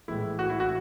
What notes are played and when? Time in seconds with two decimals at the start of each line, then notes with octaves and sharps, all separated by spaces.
0.08 A2 E3 G#3 E4
0.39 F#4
0.50 E4
0.60 F#4